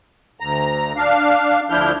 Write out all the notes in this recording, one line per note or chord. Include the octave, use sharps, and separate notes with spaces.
D2 A#5
D4 F5
D2 F3 D4 E4 F6 G6